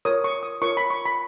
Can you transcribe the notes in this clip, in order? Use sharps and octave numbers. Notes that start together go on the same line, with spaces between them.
F4 A#4 C#5 D#6
C#6
D#6
F4 A#4 C#5 C#6
B5
C#6
B5